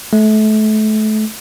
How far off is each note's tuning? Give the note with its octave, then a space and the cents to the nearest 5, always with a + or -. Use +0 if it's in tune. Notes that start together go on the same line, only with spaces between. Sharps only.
A3 -30